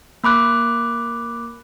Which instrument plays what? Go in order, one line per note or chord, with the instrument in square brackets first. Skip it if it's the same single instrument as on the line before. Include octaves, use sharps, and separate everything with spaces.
[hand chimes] A#3 B5 D6 F#6